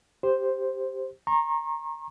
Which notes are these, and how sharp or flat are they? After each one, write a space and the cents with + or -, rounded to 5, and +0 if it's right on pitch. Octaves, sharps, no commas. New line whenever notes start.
G4 +0 C5 +0
A#5 +0 C#6 -40